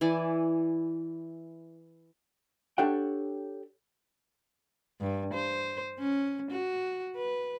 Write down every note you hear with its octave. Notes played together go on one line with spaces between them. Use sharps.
E3 E4 D5 G#5
D4 G4 A4 C#5 F#5 G5
G2
C5
C#4
F#4
B4